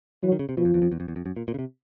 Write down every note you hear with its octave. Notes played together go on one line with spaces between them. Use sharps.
E3 F#3
D#3
C#3
C3
B2 F3
F2
E2
F2
E2
F2
E2
F2
F#2
A#2
A#2
C#3
C3